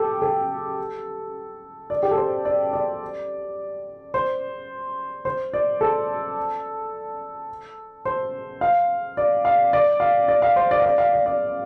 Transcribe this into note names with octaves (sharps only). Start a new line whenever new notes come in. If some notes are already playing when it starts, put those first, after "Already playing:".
Already playing: G4 A4
A4
D5
G4
A4
C5
D5
D5
C5
C5
D5
A4
C5
F5
D5
F5
D5
F5
D5
F5
C5
D5
F5
D5
F5
D5
D5